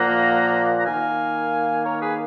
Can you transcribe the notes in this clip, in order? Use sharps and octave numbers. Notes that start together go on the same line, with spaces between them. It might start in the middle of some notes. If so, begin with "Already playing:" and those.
Already playing: A#2 F3 A#3 F#5 A#5
A#5
D#3 A#3 F5 G#5
A#4 C#5
G#4 B4